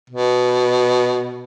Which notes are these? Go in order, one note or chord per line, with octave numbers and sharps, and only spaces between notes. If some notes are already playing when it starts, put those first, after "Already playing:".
B2